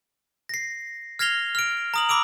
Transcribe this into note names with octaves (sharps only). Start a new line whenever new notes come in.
A#6 C7
F6 G#6 A#6 C7 F7 G7
F6 D7
A#5 D#6 F#7
B5 D6 E6 D7 F7